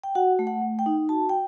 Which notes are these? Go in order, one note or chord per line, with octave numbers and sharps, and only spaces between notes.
G5
F#4 F#5
A3
F#5
A3
G5
D#4
F#4 A5
G5